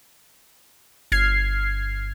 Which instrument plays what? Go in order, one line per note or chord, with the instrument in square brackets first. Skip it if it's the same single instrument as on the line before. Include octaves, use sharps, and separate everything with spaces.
[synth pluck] G1 F6 G#6 C7